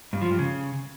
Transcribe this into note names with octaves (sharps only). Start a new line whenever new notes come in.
G2
F3
G2
C#3